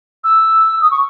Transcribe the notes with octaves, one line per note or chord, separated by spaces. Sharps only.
E6
D#6
C#6